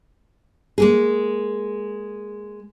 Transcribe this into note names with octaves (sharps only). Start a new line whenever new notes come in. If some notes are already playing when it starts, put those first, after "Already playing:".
G#3 A#3 G#4